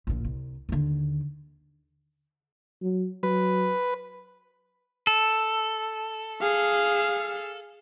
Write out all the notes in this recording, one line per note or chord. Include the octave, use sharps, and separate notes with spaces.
A#1 A#2
C2
D#2 D3
F#3
F#3 B4
A4
G#4 F5